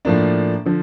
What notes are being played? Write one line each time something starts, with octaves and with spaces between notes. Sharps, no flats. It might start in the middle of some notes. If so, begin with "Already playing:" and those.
A2 F3 A#3 D4
D3 F3